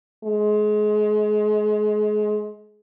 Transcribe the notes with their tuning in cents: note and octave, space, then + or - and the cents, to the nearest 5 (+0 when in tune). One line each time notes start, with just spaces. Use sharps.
G#3 +30